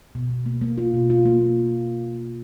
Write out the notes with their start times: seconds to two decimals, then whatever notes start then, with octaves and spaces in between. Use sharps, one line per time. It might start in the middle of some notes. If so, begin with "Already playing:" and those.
0.15 B2
0.30 B2
0.46 A#3
0.61 A#3
0.78 F4
0.94 B2
1.10 F4
1.25 A#3